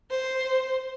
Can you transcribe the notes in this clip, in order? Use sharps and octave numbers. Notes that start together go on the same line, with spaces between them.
C5